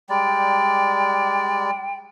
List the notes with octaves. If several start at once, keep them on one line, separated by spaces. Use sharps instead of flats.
G3 G#3 D5 G5